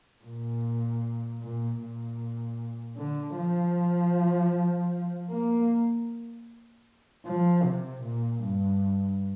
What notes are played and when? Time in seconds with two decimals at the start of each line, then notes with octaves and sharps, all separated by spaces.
0.24 A#2
1.42 A#2
1.80 A#2
2.98 D3
3.37 F3
5.31 A#3
7.26 F3
7.63 C3
8.03 A#2
8.42 G2